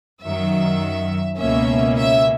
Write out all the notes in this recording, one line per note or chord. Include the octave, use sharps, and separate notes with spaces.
F#2 D#3 F#3 E5
C#2 B2 A#3 C#4 E5
E5